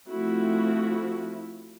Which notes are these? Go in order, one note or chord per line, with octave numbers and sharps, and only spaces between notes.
F3 A3 C4 E4 F#4